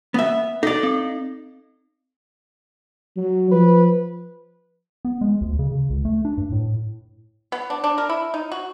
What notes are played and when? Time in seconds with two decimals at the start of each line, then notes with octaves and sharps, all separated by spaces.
0.14 B3 E5
0.63 D#4 A4 D5
0.83 C4
3.17 F#3
3.52 F3 B4
5.05 B3
5.21 G#3
5.41 D2
5.59 C#3
5.71 C#3
5.90 C#2
6.05 A3
6.25 D4
6.38 G2
6.52 A2
7.52 B3
7.70 D4
7.84 D4
7.98 A#4
8.09 E4
8.34 D#4
8.52 F#4